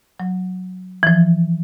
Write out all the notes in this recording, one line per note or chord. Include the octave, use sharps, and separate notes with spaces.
F#3
E3
F3